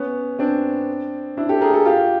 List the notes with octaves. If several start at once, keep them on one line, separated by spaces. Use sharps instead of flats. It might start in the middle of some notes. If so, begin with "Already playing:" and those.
Already playing: B3 C#4
C4 D4
D4 E4
G4 A4
G#4 A#4
G4 A4
F4 G4